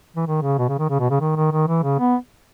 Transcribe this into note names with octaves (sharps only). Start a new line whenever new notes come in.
E3
D#3
C#3
B2
C#3
D#3
C#3
B2
C#3
D#3
D#3
D#3
E3
C#3
B3